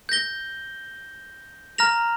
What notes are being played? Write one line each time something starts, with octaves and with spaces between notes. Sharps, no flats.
G6 A#6 G7
A#5 F6 A#6 F7